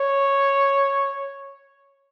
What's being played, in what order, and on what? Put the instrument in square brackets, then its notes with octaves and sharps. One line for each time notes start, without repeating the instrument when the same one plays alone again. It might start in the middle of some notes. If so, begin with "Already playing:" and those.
Already playing: [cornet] C#5